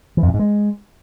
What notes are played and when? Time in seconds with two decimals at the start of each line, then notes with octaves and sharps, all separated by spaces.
0.17 E3
0.23 F2
0.28 A2
0.34 G#2
0.39 G#3